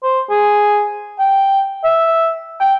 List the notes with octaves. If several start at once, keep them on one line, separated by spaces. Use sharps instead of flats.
C5
G#4
G5
E5
G5